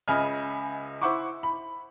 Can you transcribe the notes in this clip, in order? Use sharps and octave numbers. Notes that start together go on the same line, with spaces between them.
C#2 C#3 D#5 E5 G#5 F6
E4 C5 F#5 C#6 D6
B5